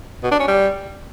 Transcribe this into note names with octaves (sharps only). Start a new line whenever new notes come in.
B2
D4
C#4
G3